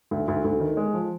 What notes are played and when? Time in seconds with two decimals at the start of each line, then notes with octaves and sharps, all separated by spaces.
0.11 D2
0.28 D2
0.44 D2
0.60 D#3
0.77 G#3
0.93 F3